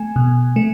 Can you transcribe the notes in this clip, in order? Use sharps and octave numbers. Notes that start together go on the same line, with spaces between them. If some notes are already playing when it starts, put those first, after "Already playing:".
Already playing: A3 G#5
B2
A3